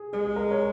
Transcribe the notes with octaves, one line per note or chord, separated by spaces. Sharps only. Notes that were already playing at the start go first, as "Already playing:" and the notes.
Already playing: G#4
G#3 G#4
G#4
A#4
C#5